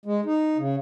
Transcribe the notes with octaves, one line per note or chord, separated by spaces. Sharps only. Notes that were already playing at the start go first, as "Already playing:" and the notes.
G#3
D#4
C#3